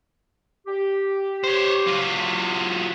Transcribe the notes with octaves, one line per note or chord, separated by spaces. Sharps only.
G4
C5 C#5
F#3 F4